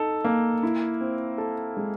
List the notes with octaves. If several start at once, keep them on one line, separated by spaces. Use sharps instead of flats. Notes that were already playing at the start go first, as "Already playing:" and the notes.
Already playing: D#4 A4
A#3
E4
C4
A4
G#3